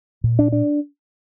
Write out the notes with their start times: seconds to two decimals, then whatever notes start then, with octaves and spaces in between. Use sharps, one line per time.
0.24 A#2
0.39 D4
0.52 D4